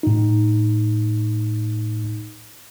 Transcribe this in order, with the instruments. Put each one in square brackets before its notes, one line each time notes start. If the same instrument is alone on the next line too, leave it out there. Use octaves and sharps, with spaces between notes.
[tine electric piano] A2 D#4